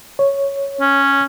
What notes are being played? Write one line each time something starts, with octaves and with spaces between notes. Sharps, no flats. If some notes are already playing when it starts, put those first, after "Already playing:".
C#5
C#4